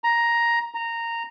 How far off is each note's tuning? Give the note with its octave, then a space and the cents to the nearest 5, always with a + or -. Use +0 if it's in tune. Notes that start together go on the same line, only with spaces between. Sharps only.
A#5 +10
A#5 -10